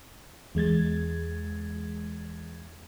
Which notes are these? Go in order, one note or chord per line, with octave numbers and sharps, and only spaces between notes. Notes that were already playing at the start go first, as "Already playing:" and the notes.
E2 G#3 G#6 A6